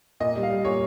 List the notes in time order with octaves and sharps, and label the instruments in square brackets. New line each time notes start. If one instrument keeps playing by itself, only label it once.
[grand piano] A#2 D#5
G3
F5
G3
A#2 C#5